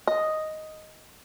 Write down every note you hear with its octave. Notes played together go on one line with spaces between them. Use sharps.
D#5